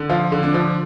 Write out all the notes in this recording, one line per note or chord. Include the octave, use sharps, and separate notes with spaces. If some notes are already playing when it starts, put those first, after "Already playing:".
Already playing: D3
F3 F4
D3
D4
F3